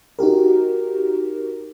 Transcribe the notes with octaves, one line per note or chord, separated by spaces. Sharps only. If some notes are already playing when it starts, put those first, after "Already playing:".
D#4 F#4 G4 A#4